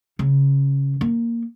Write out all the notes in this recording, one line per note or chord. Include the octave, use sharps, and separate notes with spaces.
C#3
A#3